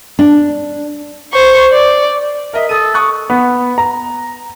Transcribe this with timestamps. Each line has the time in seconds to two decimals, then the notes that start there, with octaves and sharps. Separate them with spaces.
0.19 D4
1.32 C5 C#6
1.72 D5
2.53 A#4 D#5 E5
2.69 A4 D#6 D#7
2.94 C#6 D#6 F#6
3.30 B3
3.78 A#5